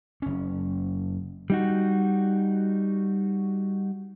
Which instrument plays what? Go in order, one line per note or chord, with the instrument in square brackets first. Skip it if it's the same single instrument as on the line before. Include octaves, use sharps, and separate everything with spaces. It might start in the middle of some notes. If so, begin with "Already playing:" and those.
[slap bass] F#1 C#4
[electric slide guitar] G3 D#4 F#4